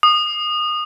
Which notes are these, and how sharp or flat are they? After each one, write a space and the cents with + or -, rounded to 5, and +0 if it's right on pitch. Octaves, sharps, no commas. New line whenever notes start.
D#6 -25